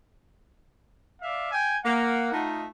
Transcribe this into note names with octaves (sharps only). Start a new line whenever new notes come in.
D5 E5 F5
G5 G#5
A#3 F#5
A3 D#4 F4